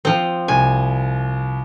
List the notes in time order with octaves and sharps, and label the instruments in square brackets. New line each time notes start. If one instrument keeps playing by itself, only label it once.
[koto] F3 C4
[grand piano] C2 [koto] G#5